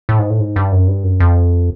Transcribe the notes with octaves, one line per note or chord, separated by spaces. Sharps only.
A2
G#2
A2
G#2
G2
F#2
G2
F#2
F2